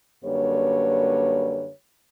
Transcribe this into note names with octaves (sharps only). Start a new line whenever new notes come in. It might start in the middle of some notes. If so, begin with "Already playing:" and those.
F#2 D3 G3 A#3 B4 C#5